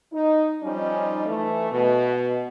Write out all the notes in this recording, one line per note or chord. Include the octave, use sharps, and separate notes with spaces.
D#4
F3 G3 C#4 D#4
E3 A3
B2